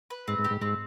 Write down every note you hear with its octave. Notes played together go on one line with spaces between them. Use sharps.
B4
G#2 C4
G#2
G4
G#2
G#2 C4